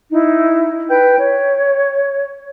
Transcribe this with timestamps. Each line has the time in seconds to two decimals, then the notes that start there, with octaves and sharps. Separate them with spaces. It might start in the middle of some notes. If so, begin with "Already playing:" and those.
0.12 D#4 E4
0.89 B4 G5 G6
1.18 C#5